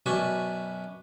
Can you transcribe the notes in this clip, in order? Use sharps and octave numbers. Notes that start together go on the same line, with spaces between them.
F#2 B2 D4 G#5 B5 C#6